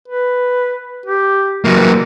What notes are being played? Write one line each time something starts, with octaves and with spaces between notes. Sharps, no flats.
B4
G4
E3 F#3 A#3